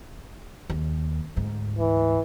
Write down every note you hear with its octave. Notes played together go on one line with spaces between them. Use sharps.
D#2
D2 G#2
E3